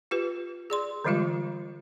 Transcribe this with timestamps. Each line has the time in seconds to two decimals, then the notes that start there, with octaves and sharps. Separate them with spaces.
0.11 F4 G4 B4
0.70 G#4 D5 C6
1.05 D3 E3 G3 G#3 F4 G4